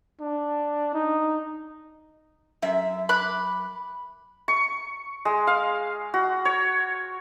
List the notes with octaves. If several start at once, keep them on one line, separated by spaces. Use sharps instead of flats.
D4
D#4
F#2 E5
B5 D6 F#6
C#6
G#3
F5
F#4
C#5